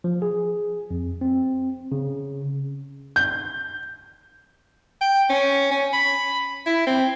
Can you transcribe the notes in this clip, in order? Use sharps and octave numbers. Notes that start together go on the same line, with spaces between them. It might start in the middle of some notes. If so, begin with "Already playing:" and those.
F3
G#4
F2
C4
C#3
G6
G5
C#4
C#4
B5
E4
C4